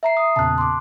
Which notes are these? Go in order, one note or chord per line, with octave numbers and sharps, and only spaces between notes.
E5 A#5 C7
D#6
E2 A#2 C#3 A5 F#6
C6 D6